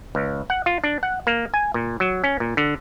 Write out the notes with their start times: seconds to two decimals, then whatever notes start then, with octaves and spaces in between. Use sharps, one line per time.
0.15 C#2
0.50 F#5
0.66 F4
0.84 D4
1.03 F#5
1.27 A#3
1.54 G#5
1.74 A#2
2.00 F#3
2.24 C#4
2.40 A#2
2.57 D3